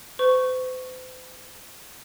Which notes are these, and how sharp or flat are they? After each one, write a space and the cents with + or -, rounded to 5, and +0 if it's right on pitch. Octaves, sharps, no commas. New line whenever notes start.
C5 -40 C#6 +0